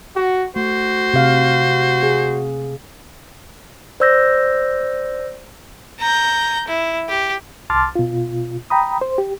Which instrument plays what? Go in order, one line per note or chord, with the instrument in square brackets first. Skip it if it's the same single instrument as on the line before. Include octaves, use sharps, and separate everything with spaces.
[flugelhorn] F#4
[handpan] A3 [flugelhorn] F#4 [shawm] C5
[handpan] C3 F5
G#4
[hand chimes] C5 D5 E6 G6 A#6
[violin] A#5 G6
E4
G4
[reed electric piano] C2 A5 C6 D6 F6 A6
B2 F4
G5 A#5 B5 D#6
C5
G4